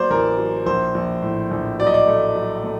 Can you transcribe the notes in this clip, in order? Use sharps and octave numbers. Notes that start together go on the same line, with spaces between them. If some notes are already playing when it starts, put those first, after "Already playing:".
Already playing: F#3 A#3 C5 D5
A1 A#4
F#3
A#1 C5
A#1
A2
A#1
F#3 D5
D#5
D5
A3
F#3
A3